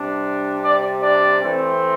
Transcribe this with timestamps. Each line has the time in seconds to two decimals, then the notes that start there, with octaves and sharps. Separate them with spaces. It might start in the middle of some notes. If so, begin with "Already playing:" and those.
Already playing: C3 G3 D4
0.63 D4 D5
1.02 D4 D5
1.41 E3 A3 C4